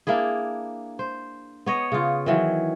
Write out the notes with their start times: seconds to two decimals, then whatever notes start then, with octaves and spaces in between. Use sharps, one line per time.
0.07 A#3 D4 E4 G#4
0.99 C5
1.66 B3 C#5 D#5
1.92 C#3 F4
2.26 D#3 E3 F#3